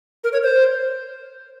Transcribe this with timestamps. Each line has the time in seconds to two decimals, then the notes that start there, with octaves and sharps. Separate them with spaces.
0.24 A#4
0.33 C#5
0.43 C5